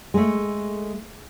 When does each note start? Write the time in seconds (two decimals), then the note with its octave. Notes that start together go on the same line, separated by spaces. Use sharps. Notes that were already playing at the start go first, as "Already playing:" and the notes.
0.14 G#3 A3